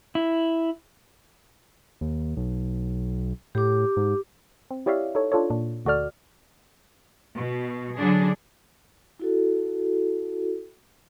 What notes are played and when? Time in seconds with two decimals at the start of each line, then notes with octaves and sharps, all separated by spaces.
0.15 E4
2.01 D#2
2.37 B1
3.55 A2 G4 D6
3.97 G#2
4.71 C4
4.86 E4 G4 C#5 D5 E5 F5
5.15 D#4 A4 C#5
5.32 D4 F4 A4 C#5
5.50 A#2 D4
5.85 D2 F#4 A4 D5 F6
7.36 B2
7.97 D3 F#3 D4 G#4
9.19 E4 F#4 A4